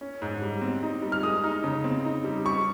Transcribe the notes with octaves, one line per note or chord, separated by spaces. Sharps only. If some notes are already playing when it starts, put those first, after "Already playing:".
C#4
G#2
G3
C4
D#4
G3
F6
G#3 D#6
D#4
C#3
C4
D#4
G3
G3 C#6